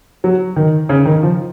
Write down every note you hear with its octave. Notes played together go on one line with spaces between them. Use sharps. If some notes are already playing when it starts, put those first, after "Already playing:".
F#3
D#3
C#3
D#3
F3